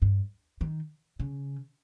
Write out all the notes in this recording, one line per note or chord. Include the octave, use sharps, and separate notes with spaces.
G2
D#3
C#3